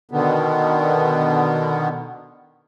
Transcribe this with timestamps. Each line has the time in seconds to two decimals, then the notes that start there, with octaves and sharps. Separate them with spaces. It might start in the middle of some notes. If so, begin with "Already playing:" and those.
0.11 B2 D3 D#3 B3